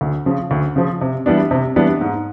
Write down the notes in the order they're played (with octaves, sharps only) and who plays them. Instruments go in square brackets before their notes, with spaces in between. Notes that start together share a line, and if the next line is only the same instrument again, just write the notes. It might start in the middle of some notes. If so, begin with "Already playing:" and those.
[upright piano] D2
C#3 F3
D2
C#3 F3
C3
E3 G3 B3 D4
C3
E3 G3 B3 D4
G#2